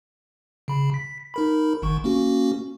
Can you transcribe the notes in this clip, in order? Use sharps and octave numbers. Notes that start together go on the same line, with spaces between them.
C#3 B5
B6
D#4 A#4 B5
G1 D#3 C#6
A#3 C#4 F#4